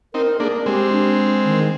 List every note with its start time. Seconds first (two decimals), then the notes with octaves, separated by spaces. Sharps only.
0.14 C4 D#4 A#4
0.40 A#3 D4 G#4
0.66 G#3 C4 G4
0.92 D4
1.45 D#3